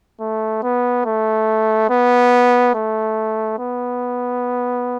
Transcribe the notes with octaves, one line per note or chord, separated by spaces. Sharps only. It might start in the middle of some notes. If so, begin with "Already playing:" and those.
A3
B3
A3
B3
A3
B3